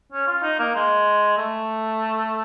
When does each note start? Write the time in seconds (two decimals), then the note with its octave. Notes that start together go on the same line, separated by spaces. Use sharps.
0.12 C#4
0.27 F4
0.43 D#4
0.59 A#3
0.75 G#3
1.37 A3